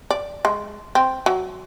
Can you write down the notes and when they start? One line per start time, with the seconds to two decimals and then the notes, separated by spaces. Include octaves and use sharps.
0.11 D5
0.45 G#3
0.95 C4
1.26 F#3